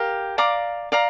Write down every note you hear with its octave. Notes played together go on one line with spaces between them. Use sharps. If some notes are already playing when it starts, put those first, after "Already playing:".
Already playing: G4 A#4 F5
D5 F5 A#5 D6
D5 F5 A#5